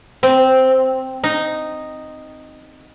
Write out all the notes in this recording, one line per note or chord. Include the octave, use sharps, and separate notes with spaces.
C4
D#4